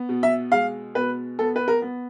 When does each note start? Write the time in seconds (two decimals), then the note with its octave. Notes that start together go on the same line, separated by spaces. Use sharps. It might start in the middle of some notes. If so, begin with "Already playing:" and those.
Already playing: B3
0.09 B2
0.23 E5
0.52 G#3 F5
0.95 B2 B4
1.39 B3 A4
1.56 B4
1.68 A#4
1.82 B3